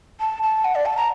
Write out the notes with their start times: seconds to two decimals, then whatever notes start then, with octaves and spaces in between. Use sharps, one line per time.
0.20 A5
0.43 A5
0.65 F#5
0.75 D5
0.86 A5
0.97 A#5